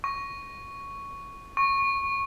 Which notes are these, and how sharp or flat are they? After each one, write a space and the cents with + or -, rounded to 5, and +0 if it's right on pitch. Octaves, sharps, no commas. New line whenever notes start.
C#6 +5
C#6 -15